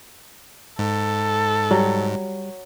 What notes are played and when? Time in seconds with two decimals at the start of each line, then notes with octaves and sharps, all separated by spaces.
0.79 G#2 A4
1.71 F#3 G3